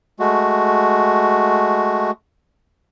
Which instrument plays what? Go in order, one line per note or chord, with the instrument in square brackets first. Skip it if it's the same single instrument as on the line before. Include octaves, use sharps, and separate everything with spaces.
[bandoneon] G#3 A3 F#4